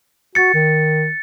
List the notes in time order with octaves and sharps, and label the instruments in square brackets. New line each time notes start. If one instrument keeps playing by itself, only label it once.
[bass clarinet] F#4 [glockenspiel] A6 C#7
[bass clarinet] D#3